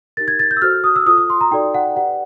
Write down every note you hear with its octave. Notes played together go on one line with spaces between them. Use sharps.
D#4 G4 A#4 A6
G#6
A6
G6
E6
F#4 A4 C5 F6
D#6
E6
F4 A4 C5 D#6
D#6
C6
A#5
D#4 F#4 A4 D5 G5
F#5
G4 B4 D5 F#5